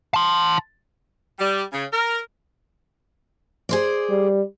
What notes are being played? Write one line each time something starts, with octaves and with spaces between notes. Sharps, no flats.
A5 C6
G3
C#3
A#4
G#4 C5 D5
G3